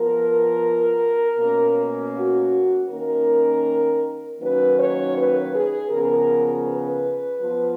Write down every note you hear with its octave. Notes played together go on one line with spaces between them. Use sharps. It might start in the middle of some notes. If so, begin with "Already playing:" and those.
Already playing: F3 B3 A#4
B2 A#3 C#4
F#4
D#3 A#3 C#4 A#4
D#3 F#3 A#3 C#4 B4
C#5
B4
G#4
C#3 F3 B3 A#4
B4
F3 B3